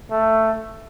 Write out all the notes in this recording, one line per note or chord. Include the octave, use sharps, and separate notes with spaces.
A3